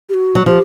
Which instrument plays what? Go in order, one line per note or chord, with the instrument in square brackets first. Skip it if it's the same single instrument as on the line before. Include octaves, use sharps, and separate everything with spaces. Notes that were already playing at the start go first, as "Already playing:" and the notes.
[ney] G4
F#4
[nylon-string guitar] F#3
[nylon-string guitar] F3 [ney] G4